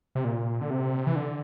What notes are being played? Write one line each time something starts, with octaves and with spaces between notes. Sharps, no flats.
C3
A#2
D3
C3
E3
D3